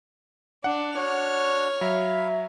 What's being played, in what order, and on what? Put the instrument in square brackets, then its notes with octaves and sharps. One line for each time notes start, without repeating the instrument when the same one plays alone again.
[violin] D4 [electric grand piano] F#5
[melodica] D4 F#4 [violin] C#5 F6
[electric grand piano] F#3 [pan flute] E5 [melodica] F5 B5